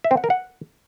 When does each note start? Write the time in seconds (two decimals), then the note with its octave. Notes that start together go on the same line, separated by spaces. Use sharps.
0.04 E5
0.11 C4
0.17 F#5
0.24 A#4
0.30 F#5